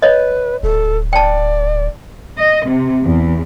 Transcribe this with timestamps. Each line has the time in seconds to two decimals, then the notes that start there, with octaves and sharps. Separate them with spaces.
0.02 B4 C#5 D#5
0.63 D1 A4
1.13 D5 G5 A5
2.39 D#5
2.68 C3
3.05 E2